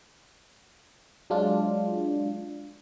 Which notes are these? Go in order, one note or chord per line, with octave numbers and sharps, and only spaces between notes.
F#3 G#3 D4 F4